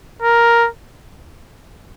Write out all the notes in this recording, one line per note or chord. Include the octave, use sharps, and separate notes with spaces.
A#4